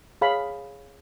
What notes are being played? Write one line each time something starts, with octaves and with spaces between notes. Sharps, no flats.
G#4 C#5 F5 B5